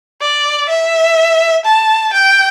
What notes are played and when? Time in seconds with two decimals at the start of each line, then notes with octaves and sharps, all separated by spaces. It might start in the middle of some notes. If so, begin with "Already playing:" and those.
0.21 D5
0.69 E5
1.65 A5
2.13 G5